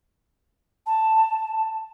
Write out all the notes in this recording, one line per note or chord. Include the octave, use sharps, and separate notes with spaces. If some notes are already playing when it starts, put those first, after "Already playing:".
A5